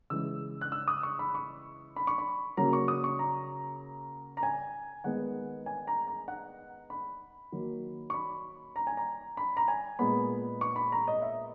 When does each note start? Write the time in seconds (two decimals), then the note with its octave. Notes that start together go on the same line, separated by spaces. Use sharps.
0.10 C#3 E3 G#3 E6
0.61 F#6
0.72 E6
0.88 D#6
1.03 C#6
1.19 B5
1.35 C#6
1.96 B5
2.07 C#6
2.18 B5
2.57 C#3 F#3 A#3 A#5
2.73 C#6
2.88 D#6
3.04 C#6
3.19 A#5
4.37 A#5
4.43 G#5
5.04 D#3 G#3 B3 F#5
5.66 G#5
5.87 A#5
6.07 A#5
6.28 F#5
6.90 B5
7.52 D#3 F#3 A#3
8.10 C#6
8.14 B5
8.76 A#5
8.87 G#5
8.97 A#5
9.37 B5
9.57 A#5
9.68 G#5
9.99 A#2 G#3 B3 B5
10.61 C#6
10.76 B5
10.92 A#5
11.08 D#5
11.22 E5